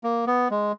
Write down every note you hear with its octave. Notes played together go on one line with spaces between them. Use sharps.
A#3
B3
G#3